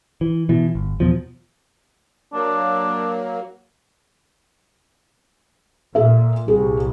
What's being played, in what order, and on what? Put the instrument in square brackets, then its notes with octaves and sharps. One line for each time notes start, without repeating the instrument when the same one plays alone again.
[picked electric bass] E3
B2 E3
G1
E2 B2 F3
[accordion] F#3 A#3 [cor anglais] D4
[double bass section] A#2 [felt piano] A4 E5
[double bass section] C2 [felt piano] G#4